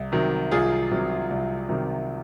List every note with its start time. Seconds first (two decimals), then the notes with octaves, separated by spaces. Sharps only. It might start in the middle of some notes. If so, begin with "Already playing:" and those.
Already playing: C2
0.12 C3 D#3 F#3
0.51 C2 F4 G#4
0.92 C3 D#3 F#3
1.30 C2
1.69 C3 D#3 F#3